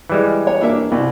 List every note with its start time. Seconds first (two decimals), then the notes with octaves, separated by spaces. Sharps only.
0.10 E3 G3 G#3
0.47 C#5
0.61 A#3 D4 E5
0.91 C2 E4